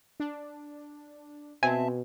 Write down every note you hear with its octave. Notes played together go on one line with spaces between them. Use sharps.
D4
B2 C4 E5 G#5 A5